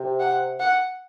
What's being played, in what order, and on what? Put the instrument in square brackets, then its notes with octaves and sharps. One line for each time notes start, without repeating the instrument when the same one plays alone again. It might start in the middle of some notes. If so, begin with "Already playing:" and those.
Already playing: [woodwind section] C3
[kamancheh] F#5
F#5